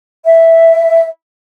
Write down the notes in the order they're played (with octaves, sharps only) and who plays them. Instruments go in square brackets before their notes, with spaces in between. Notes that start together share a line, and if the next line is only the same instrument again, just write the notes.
[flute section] E5